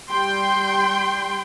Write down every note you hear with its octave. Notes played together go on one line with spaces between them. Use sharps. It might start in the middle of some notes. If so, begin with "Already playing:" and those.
G3 G5 C6